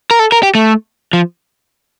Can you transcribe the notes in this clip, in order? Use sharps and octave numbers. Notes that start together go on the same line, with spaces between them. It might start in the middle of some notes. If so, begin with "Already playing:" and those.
A#4
A4
A#4
G4
A3
F3